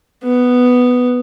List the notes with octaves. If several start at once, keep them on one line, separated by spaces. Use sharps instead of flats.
B3